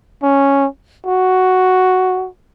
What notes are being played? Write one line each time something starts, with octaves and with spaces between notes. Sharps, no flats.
C#4
F#4